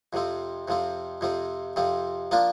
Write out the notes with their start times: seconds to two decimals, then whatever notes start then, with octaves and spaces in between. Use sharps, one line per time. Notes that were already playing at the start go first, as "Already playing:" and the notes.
0.13 F2 C3 F3 C4
0.68 F2 C3 F3 C4
1.21 F2 C3 F3 C4
1.76 F2 C3 F3 C4
2.31 F3 A#3 D4 F4